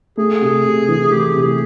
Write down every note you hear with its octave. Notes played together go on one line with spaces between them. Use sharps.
A3 G#4
C3
C3
E3
A3 G4
C3
G#4